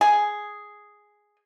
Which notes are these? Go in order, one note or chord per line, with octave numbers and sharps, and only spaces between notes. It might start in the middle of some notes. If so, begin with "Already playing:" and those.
G#4